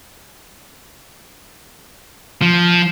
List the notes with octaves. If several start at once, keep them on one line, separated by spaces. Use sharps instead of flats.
F3